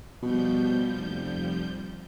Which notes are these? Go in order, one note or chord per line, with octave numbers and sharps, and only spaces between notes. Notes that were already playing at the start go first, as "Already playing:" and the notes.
B2 F3 G3 G6
F1